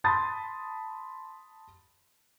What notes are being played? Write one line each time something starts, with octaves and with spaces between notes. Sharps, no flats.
A5 B5 C6 D#6 A6